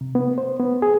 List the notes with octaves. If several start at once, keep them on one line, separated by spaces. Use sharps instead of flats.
C3
B3
C5
B3
G#4